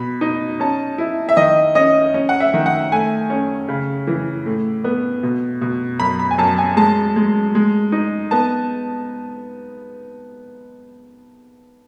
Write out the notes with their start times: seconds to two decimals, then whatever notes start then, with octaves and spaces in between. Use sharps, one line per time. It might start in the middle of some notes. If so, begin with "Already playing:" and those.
Already playing: B2 B5
0.21 D#4
0.60 C#4 A5
0.98 E4
1.29 E5
1.37 D#3 D#5
1.75 C#4 D#5
2.14 C#4
2.29 F#5
2.40 E5
2.54 D#3
2.66 F#5
2.92 A3 G#5
3.30 C#4
3.68 C#3
4.07 E3
4.46 A2
4.84 B3
5.23 B2
5.61 B2
6.00 F#2 B5
6.19 B5
6.31 G#5
6.38 F#2 A5
6.58 G#5
6.77 G#3 A5
7.16 G#3
7.55 G#3
7.92 D#4
8.31 B3 A5